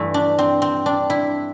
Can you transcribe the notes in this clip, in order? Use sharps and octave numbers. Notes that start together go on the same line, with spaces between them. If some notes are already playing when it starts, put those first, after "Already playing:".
Already playing: G2 E3 A3 E4
D4
C4
C4
D4
E4